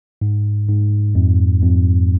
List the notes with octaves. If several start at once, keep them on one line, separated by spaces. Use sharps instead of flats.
G#2
G#2
F2
F2